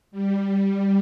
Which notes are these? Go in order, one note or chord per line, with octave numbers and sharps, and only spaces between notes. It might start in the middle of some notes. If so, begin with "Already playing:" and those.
G3